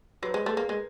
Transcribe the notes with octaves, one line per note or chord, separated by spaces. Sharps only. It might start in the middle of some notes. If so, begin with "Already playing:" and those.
F#3 B4
C5
G#3
B4
A3 G#4
A#3 A#4
G#3